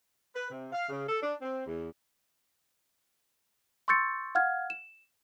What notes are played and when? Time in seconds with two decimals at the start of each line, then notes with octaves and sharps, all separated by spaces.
0.34 B4
0.51 C3
0.73 F5
0.89 C#3
1.09 A4
1.22 D4
1.42 C4
1.66 E2
3.88 C6 C#6 E6 G6 A6 C#7
4.35 F5 F#5 F6 G#6
4.70 E7